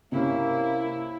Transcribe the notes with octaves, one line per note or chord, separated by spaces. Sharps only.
C3 A#3 C#4 E4